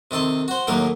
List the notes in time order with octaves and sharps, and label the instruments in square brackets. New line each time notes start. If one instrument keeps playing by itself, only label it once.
[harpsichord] C3 D#3 A4 C6
F#4 C5
D#2 A2 F#3 A#3 A#4 B4